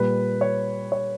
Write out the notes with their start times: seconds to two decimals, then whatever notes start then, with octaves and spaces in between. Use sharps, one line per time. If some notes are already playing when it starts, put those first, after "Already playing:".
Already playing: A#2 G3 B4
0.41 C#5
0.92 C#5